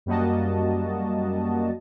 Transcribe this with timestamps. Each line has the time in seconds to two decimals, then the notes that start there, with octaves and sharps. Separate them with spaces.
0.06 F#2 G3 A#3 F#4 D#5 A5